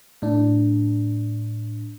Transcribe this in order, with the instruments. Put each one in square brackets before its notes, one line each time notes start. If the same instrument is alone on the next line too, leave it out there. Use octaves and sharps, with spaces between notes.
[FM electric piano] A2 D4